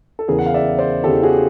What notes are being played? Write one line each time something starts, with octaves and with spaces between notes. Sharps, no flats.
A4
E2 C#3 E3 G#4 A#4
F#5
F5
D5 E5
C5 D5
E2 C#3 E3 G4 A4
F#4 G#4